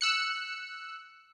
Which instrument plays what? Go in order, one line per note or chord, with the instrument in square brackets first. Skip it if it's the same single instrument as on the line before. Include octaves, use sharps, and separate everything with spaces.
[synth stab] E6 F#6 C#7